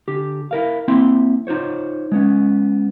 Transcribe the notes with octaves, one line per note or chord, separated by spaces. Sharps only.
D3 G4
E4 A#4 F5
A#3 C4 E4 E5 C6
D#4 F4 C5 C#5
G#3 B3 C#4